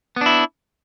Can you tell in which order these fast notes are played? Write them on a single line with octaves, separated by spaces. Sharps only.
B3 D4 E4